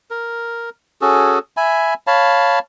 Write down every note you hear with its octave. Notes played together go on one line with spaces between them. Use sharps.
A#4
C#4 F#4 G#4 A4
E5 G#5 B5
C#5 F5 A5 B5